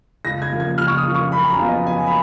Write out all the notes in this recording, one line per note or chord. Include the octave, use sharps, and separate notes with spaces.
C#2 A#6
G#6
C#3 F3 A#3
G#6
C#2 F6
C#6
D#6
C#3 F3 A#3
C#6
F#2 B5
G#5
A#5
C#3 F3 B3 F4
D#5
F#2 G#5
B5